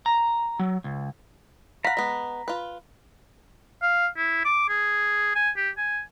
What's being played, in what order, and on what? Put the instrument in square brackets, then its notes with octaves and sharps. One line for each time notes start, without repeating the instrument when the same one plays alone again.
[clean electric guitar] A#5
F#3
C#2
[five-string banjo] F5 F#5 [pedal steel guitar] A#5 B5
[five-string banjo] G#3 B3
F4 B4
[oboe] F5
E4
D6
G#4
G#5
G4
G#5